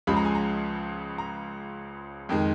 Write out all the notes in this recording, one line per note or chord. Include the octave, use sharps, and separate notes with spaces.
C#2 C#3 F3 G#3 B5
A#5
G#5
A#5
A#5
F2 D#3 G#3